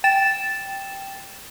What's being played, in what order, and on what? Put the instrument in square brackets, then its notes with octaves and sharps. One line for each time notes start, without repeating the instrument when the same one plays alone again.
[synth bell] G5 A6 E7